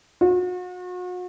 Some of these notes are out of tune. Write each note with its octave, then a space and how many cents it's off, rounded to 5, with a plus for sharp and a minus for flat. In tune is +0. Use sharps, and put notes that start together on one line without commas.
F#4 -40